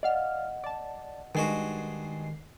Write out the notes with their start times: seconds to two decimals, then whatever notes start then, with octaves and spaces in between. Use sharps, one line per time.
0.03 D5 D#5 F5 F#5 F6
0.64 D5 A5
1.35 G2 D#3 G#3 F#4 C7